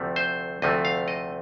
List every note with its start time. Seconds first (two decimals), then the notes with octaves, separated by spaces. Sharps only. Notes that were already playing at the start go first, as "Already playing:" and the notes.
Already playing: D2 C3 F3 A3
0.16 C5
0.62 D2 C3 F3 A3 D#5
0.85 F5
1.08 D#5